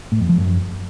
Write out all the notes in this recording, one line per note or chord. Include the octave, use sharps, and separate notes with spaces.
A2
F2
F3
F#2